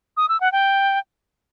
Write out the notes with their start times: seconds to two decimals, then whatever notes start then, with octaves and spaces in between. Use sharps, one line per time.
0.17 D#6
0.29 E6
0.41 F#5
0.52 G5